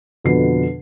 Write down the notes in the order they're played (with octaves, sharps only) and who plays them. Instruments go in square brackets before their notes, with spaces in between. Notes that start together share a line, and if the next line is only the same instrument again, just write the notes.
[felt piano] F2 B2 D3 B4 C7